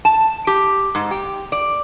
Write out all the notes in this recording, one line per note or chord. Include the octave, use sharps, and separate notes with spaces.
A5
G4
G#2
G4
D5